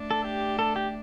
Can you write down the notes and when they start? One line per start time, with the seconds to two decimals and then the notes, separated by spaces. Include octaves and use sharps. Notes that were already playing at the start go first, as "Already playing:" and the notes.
Already playing: A3 D4
0.11 A4
0.24 G4
0.59 A4
0.76 G4